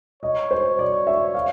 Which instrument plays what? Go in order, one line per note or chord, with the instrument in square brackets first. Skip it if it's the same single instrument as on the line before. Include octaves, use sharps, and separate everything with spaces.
[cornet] C#5 [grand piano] D#5
[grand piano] C5
D5
E5
F5